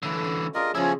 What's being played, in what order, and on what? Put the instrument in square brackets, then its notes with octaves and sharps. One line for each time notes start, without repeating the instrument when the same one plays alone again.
[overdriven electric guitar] D3 E3 [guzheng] F#3 A3 F4
[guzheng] C#4
[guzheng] D4 G#4 D5 [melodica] F4 A#4 D#5
[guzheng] C#3 C5 D#5 [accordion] F3 C#4 [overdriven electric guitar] E4 G#4 [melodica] G#5